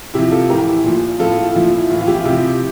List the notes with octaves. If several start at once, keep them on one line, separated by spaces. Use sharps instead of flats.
C3 F3 E4 G4
F4 A4
A2 E3 G4 A#4
E4
A#2 F3
A2 F3 F4 A4
F4
A#2 F3 E4
E4
A2 E3 F4
F4
E4 G4
F4
C3 F3 E4 G4